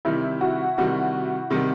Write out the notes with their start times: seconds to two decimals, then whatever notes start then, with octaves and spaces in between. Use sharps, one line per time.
0.05 C3 D#3 G3 E4
0.41 F#4
0.78 C3 D#3 G3 F#4
1.50 C3 D#3 G3